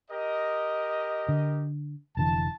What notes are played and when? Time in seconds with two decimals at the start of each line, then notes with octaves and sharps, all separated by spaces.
0.11 G4 A#4 D#5
1.29 D3
2.17 F1 D3 E3 A5